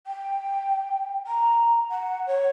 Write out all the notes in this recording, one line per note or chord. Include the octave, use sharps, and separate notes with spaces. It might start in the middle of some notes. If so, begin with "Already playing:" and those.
G5
A#5
F#5
C#5